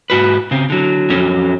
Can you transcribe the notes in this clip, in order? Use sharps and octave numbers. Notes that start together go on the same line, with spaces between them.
G#2 F#4 B4
C#3 C4
D3 F#3
F2 F#3 C#4 A4